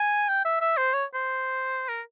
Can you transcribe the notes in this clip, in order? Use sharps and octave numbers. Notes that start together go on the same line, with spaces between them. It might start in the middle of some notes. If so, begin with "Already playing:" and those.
Already playing: G#5
G5
E5
E5
C5
C#5
C5
A#4